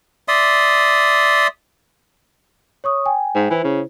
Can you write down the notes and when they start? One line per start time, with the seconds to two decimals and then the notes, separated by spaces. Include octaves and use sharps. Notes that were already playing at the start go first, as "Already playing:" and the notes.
0.28 D5 E5 C6 D#6
2.84 C#5 C#6 D#6
3.06 G5 G#5
3.35 G#2
3.51 E3 E4 C5
3.64 C#3